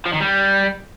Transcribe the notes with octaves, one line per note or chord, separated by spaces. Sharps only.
F3
D#3
G3